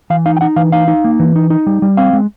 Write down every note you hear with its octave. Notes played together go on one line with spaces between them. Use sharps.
E3 F5
D#4 F5
G5
D#4 F#5
E3 F5
D#4 F5
D#4
A#3
E3
D#4
D#4
G3
G3
C4 F5
G#3